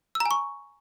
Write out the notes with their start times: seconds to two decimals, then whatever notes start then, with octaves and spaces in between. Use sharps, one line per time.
0.15 E6
0.20 A#5
0.26 G#5
0.31 C#6